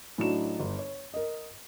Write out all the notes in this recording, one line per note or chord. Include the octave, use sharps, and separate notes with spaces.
A2 F#3 D4 D#4 F#4 E7
G1
C#5
A#4 D#5